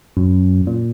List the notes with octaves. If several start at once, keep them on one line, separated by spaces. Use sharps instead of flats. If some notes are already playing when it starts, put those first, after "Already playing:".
F#2
A#2